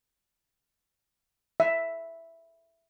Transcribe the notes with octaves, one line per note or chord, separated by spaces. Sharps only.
E5